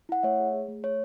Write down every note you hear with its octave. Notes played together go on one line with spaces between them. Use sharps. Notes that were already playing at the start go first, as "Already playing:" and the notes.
E4 F#5
A3 C#5 E5
G#4
G#4
A3
A3 C#5